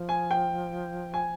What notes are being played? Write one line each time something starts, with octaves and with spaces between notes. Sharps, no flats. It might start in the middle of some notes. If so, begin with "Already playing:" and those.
Already playing: F3
G#5
G5
G#5